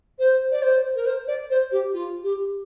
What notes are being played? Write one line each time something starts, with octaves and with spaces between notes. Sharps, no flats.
C5
D5
C5
A#4
C5
D5
C5
G4
F4
G4